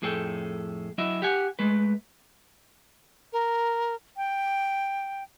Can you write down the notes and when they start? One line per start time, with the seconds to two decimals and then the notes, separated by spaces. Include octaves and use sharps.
0.02 F2 A2 G#4 A4 G5
0.98 F#3 E4 D#5 E5
1.22 G4 F#5 G#5
1.59 G#3 A3 B4
3.33 A#4
4.17 G5